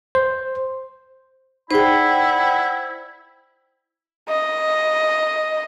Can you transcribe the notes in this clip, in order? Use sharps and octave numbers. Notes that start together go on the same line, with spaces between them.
C5
D#4 E4 G#4 C5 D5 F#5 G5 B5
D#5